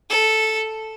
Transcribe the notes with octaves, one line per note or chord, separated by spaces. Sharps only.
A4